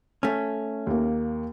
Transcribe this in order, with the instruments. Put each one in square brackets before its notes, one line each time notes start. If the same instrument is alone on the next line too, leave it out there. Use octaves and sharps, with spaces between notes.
[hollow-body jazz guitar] A3 C#4
[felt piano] D#2 A#3